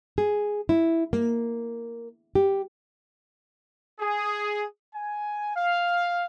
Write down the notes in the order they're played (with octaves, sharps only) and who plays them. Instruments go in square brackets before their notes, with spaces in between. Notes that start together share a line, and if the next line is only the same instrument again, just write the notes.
[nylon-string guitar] G#4
E4
A#3
G4
[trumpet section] G#4
G#5
F5